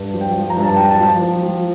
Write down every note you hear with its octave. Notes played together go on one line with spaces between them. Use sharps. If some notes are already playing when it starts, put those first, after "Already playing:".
Already playing: G2
F3
G5
F3
A#5
G2
A5
F3 G5
A5
F3
F3
F3